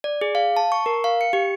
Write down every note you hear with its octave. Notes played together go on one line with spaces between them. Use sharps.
D5
G#4
F5
A5
C#6
A#4
F5
C#7
G4